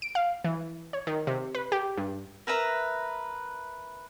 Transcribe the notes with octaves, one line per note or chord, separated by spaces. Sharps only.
D7
F5
E3
C#5
D#3
C3
B4
G4
G2
A#4 B4 E5 A#5